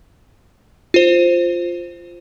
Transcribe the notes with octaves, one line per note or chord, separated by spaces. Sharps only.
F4 C5